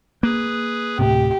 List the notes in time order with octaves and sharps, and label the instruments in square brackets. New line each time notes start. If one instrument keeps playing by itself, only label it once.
[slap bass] A#3 [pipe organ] G#4 B4
[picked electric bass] D1 A2 C3 [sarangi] G4